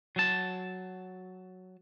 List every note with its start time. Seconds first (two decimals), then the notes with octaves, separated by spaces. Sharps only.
0.16 F#3 A5